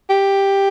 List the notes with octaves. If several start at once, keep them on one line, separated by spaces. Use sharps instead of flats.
G4